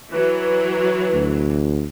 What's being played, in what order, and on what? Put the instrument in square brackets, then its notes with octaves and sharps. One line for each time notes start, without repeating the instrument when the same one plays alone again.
[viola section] E3 F#3 [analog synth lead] B4
[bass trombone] D2